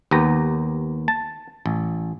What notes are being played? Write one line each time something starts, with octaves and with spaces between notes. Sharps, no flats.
D#2 B3 G4 A#5
A5
A1